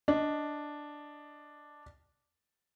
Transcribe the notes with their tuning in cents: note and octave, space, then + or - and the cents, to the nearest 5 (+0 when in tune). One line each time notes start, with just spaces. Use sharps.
D4 +0 D#5 +0